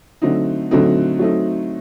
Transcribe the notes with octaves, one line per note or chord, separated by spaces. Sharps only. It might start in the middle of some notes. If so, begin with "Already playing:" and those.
D3 F#3 A3 C4 D#4
D3 F#3 A3 C4 D#4
F#3 A3 C4 D#4